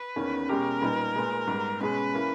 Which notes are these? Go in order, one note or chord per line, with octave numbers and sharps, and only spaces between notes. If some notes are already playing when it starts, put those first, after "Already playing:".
Already playing: B4
E2 D#3 A#3 C#4
B2 G#3 C#4 G4 A#4
A#2 G3 B3 D#4
A#2 G#3 B3
G#2 G3 B3
B2 G#3 C#4 G#4 B4
E3 A#3 C#4